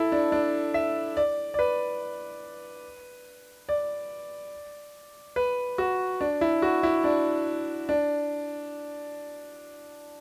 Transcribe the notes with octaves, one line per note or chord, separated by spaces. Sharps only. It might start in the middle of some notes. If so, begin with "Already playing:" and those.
Already playing: E4 A4
D4
D4
E5
D5
D5
B4
D5
B4
F#4
D4
E4
F#4
E4
D4
D4